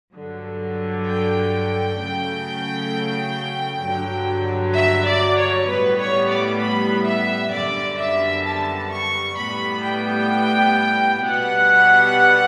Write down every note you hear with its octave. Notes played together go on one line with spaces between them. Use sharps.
G2 D3 F#3
G5
C#3 F#3 A3
G2 D3 F#3
E5
D5
C#5
A2 G3 B3 B4
C#5
D5
B5
E5
F#2 D3 G3 B3 D5
E5
A5
C#6
A2 G3 B3 B5
G5
B2 G3 B3 F#5